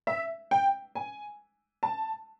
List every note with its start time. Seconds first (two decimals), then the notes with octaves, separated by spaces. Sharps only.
0.07 E5
0.51 G5
0.95 G#5
1.83 A5